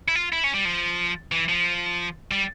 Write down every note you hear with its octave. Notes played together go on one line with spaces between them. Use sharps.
E4
F4
E4
C#4
G3
F3
E3
F3
G3